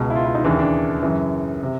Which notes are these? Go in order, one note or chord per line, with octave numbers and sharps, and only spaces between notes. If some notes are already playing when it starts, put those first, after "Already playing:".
Already playing: C#2 B2
E4
F4
E4
D#4
D#2 C#3 E3 D4
D4
F#2 C#3 E3
C3